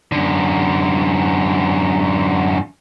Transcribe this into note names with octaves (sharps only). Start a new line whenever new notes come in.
F#2 D3